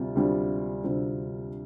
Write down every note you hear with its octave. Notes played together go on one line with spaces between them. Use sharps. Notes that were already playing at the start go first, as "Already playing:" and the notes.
Already playing: D2 C3 G3 C4 F4
D2 C3 G3 C4 F4
D2 C3 G3 C4 F4